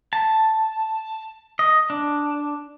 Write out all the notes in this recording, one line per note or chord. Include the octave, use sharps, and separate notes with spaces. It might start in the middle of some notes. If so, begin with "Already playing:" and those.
A5
D#5
D4